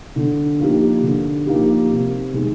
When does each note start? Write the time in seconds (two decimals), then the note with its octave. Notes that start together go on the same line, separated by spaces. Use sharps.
0.16 D3
0.60 F3 A#3 D#4 G4
1.02 D3
1.46 F3 A#3 D#4 G4
1.90 C3
2.33 D#3 G#3